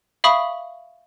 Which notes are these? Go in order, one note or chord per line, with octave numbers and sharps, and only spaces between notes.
E5 F5 B5 C#6 D#6